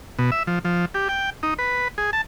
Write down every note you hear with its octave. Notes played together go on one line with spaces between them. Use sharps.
B2
E5
F3
F3
G4
G5
D#4
B4
G#4
A5